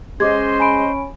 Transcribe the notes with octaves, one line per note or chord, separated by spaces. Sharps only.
G#3 C#4 C5 D#5 C6 D6 G#6
G#5 B5 D7